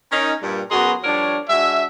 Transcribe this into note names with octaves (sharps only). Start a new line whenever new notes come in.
C#4 D#4 A#4
G2 A#2 G3
F#2 B3 F#4 G#4 A#5 C6
F3 G3 D4 A#4 C#5
G#3 D4 F#4 E5